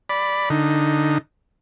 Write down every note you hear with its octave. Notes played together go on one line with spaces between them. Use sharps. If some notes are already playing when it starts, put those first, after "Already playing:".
D5 B5
D3 D#4